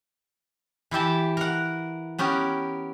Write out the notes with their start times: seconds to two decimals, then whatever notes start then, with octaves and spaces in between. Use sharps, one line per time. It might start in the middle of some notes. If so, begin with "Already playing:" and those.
0.91 E3 E4 G4 A5
1.37 A#4 F#5
2.19 B3 C#4 G4 A#4